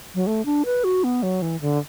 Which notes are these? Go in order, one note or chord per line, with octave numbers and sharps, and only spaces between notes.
F#3
A3
D4
B4
F#4
B3
F#3
E3
D3